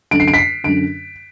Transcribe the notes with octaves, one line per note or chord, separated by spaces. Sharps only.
F#2 D3 D7
C7
D7
B6
C7
F#2 D3 D7